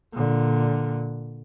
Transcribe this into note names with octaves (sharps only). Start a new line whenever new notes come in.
A#2 D3